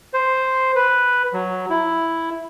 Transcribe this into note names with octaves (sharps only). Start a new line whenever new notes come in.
C5
B4
F#3
E4